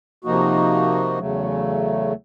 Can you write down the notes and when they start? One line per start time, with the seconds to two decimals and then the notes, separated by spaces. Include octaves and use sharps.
0.24 C3 F3 A#3 D#4 F#4
1.18 E2 C#3 F#3 A3